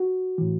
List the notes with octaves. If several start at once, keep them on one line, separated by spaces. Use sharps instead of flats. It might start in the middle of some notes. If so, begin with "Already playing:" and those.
Already playing: F#4
A2 E3